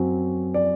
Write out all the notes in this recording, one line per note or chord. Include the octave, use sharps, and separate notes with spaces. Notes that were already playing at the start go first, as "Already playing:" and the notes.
Already playing: F#2 F#3 C4
D5